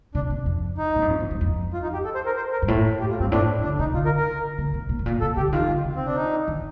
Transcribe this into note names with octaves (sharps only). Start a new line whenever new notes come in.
C3 D4
C3
F2
D#4
A2
G2
F2
F2
G2
F2
F4
D#4
G4
A4
C5
A#4
C5
A#4
G2
A2
G4
F4
G2 C4
A2 D4
D#3
D3 D4
C3 D#4
D3 F4
A#4
A#4
D3
C3
A#2
A2
A#2
C3 A4
D3 G4
D3
D#3 F4
D3
C3
C4
D4
D#4
D#3